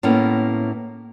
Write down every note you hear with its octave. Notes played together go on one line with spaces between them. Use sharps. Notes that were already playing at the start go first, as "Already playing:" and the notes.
A2 A#3 B3 C#4 E4